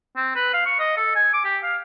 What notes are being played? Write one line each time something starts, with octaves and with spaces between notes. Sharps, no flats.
C4
B4
F5
C#6
D#5
A4
G#5
D6
G4
F5